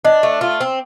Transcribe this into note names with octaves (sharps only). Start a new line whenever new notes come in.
D4 D#5
A3
F4
C4